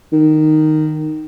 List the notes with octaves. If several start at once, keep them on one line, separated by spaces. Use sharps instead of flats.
D#3